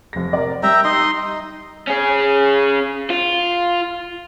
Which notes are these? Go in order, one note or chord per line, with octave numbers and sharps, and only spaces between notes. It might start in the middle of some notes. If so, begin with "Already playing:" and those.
F1 A#6
A#4 D5
G3 E5 G5 A#5
D#4 D#5 C6
D#4
C#4 G#4
F4